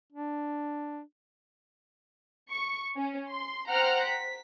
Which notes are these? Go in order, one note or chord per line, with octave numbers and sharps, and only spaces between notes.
D4
C#6
C#4
C6
C5 F#5 G5 A#5 F6
B6